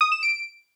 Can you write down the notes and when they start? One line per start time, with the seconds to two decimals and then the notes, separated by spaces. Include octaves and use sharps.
0.01 D#6
0.12 E7
0.23 D7